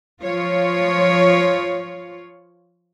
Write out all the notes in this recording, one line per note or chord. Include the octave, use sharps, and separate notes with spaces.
F3 F4 C#5